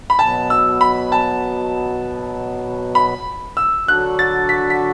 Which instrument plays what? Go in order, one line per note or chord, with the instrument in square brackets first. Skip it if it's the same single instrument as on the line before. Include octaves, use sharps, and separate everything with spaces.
[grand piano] B5
[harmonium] B2 F#3 B3 [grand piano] A5
[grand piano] E6
B5
A5
B5
E6
[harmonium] D3 F#3 D4 F#4 A4 [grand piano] F#6
[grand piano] A6
B6
B6